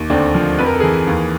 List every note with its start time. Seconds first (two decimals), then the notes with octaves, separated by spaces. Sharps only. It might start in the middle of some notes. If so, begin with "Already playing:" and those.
Already playing: D#2
0.10 D2 C4 D4
0.34 F3
0.58 F2 B4
0.66 A#4
0.74 A4
0.80 E3 G#4 A#4
1.07 D#2